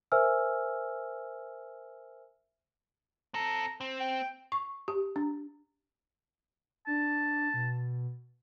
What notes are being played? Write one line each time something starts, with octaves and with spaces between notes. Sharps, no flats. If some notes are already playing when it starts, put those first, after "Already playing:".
A#4 C5 E5 G#5 E6 F6
C4 A4 A#5
C4
G5
C#6
G4
D4
D4 A5
B2